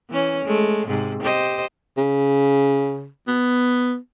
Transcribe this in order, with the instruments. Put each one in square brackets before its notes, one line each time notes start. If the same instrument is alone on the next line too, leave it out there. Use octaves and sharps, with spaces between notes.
[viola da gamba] E3 C#4
G#3 A3
G#2 C3
G4 C5 D#5
[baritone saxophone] C#3
B3